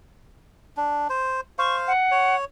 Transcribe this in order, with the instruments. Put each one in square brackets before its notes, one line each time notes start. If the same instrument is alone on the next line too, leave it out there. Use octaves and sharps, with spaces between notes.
[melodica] D4
C5
[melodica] C5 F5 [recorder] C#6
[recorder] F#5
[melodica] C#5